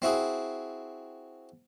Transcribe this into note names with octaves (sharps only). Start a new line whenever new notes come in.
C4 E4 F#4 G#4